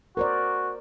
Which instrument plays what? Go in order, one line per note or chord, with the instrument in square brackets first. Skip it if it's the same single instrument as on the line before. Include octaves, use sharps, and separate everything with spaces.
[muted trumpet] F#4 [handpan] A#4 C5 D5